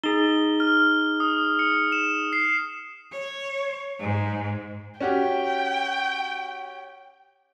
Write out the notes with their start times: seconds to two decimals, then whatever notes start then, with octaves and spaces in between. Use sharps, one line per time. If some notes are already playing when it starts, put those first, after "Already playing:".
0.04 D#4 G#4 G7
0.60 F6
1.20 D#6
1.59 C#7
1.92 E7
2.33 C7
3.12 C#5
4.00 G#2
5.00 C#4 F#4 G4 G5